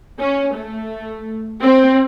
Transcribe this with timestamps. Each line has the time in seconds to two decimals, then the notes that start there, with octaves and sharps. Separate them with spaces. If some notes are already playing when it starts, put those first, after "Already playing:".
0.20 C#4
0.55 A3
1.63 C4